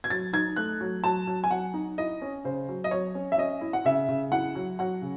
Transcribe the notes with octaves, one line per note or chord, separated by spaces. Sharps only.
G#6
F#3 A6
D#4 G#6
A3 F#6
F#3
F#3 A5
F#3
G#5
F#3 F#5
D#4
E4 D#5
C#4
C#3 C5
F#3
D#5
F#3 C#5
C#4
E5
C#4 D#5
E4
F#5
C#3 E5
C#3
E4 F#5
F#3
F#3 F#5
C#3